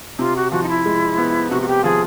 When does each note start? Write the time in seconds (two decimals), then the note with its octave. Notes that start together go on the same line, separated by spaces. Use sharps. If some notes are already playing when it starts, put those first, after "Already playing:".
0.19 C3 F4
0.36 F#4
0.52 F3 F#4
0.63 D#4
0.68 E4
0.85 G#3
1.18 B3
1.50 C3 F#4
1.62 F#4
1.68 G4
1.84 F3 G#4